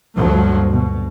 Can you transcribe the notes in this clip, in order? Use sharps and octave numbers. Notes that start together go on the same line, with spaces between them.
D2 G2 F3 F#3 A#3
B2